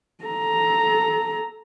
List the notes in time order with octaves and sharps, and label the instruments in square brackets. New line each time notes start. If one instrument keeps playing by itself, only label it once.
[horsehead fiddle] A4 A#5